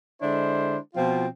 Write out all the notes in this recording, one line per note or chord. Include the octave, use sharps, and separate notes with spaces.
D3 G#3 D4 E4 C5
B2 F3 C4 F4